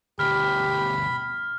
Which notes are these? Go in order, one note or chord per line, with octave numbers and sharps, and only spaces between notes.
D2 B2 G4 B5 F6